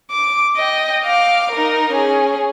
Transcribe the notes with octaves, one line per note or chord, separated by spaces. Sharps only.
D6
D#5 G5
F5 D6
D#4 A#4
C#4 G#4